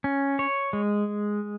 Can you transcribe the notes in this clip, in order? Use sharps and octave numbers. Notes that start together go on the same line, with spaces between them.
C#4
C#5
G#3